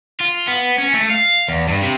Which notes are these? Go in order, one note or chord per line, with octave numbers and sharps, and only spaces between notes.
F4
B3
C#4
A3
F5
E2
G2
C3